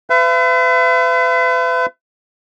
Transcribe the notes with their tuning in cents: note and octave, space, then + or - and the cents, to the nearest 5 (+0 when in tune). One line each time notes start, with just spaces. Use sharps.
B4 +40 E5 +40